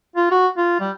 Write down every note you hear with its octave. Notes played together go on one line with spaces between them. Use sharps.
F4
F#4
F4
G3